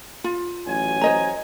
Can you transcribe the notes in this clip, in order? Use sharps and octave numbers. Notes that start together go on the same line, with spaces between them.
F4
A1 F#3 G#5
C5 D#5 A#5